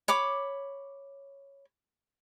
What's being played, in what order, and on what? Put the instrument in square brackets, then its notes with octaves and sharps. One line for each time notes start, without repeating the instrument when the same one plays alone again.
[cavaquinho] C#5 B5 D6